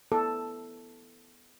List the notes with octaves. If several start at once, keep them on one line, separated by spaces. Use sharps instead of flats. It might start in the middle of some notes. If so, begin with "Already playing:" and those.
B3 E4 A4